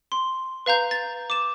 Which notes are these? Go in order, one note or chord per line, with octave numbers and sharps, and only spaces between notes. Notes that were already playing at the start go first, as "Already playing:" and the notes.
C6
B4 F5 A#5 G6
A6
D6 E7